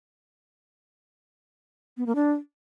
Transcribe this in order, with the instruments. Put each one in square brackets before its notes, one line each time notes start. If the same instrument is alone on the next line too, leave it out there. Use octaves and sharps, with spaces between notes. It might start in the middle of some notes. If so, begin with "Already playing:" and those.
[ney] B3
A#3
D4